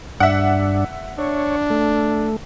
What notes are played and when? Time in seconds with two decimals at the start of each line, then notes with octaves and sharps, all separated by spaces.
0.20 G2 D4 E5 F#5
1.19 D4 C#5
1.70 A3